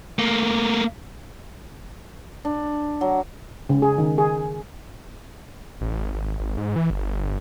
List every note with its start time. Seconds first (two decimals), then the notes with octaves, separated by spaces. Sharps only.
0.19 A3 A#3
2.45 D4
3.01 F#3
3.69 C#3
3.82 G#4
3.98 D#3
4.18 G#4
5.81 A1
6.01 G#1
6.14 G#1
6.39 G#1
6.57 G#2
6.76 E3
6.90 G1